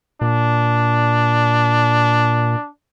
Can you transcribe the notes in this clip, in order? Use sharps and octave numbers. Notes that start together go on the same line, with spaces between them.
A#2 D4